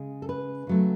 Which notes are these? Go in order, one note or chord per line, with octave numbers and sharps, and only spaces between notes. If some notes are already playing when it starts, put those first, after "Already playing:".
Already playing: C#3 G#3
A4
B4
C#3 F#3 A3